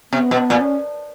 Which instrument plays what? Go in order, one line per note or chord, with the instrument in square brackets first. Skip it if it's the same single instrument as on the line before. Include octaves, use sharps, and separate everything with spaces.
[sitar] C3 [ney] B3
[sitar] B2
A#2
[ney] C#4